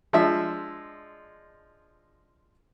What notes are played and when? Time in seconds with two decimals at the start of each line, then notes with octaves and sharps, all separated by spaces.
0.13 F3 G#3 D4 E5